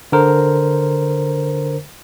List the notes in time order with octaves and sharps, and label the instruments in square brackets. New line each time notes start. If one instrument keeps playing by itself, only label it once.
[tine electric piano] D3 A#4 C5